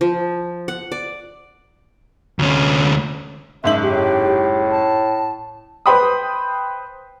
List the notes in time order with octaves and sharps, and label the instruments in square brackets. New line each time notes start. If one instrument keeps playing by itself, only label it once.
[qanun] F3
F#5
D5
[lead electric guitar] D2 C#4
[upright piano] F#1 G#2 F#7 [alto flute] E5
[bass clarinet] A2 [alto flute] G4
[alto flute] A5
[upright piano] B4 C5 G5 B5 C6 D#6